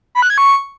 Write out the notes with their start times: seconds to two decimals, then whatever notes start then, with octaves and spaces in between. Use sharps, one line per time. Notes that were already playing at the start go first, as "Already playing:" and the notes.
0.15 B5
0.22 F#6
0.30 G#6
0.38 C#6